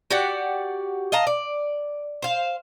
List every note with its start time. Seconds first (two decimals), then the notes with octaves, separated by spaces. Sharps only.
0.10 F#4 G4 D5 F#5
1.12 D#5 F5 A5 A#5
1.27 D5
2.22 C5 F5